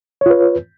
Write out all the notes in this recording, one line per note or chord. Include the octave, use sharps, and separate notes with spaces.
F4 B4 C#5